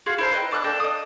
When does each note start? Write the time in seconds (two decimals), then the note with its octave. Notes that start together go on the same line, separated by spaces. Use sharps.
0.06 F4 F#4 G#4
0.18 E4 C5 A#5
0.32 B4 D#5 G5
0.51 D4 D6 E6 F#6
0.64 A#3 D4 A4 G5
0.80 D#5 D#6